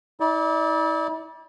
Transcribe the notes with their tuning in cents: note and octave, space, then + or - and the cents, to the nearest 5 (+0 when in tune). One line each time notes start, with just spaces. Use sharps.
E4 -45 D5 +0